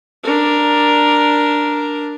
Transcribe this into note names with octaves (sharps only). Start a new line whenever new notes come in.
D4 A#4